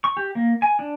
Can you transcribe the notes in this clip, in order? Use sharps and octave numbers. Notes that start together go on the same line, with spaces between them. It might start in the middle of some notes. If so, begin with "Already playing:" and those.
C#6
G4
A#3
G#5
D4